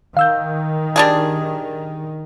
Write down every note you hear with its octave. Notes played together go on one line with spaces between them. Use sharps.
D#3 F5 E6 G6
G3 D4 G#4